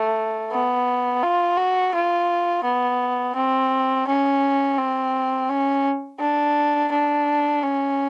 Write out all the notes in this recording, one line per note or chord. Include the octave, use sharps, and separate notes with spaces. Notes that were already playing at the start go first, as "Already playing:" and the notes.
Already playing: A3
B3
F4
F#4
F4
B3
C4
C#4
C4
C#4
D4
D4
C#4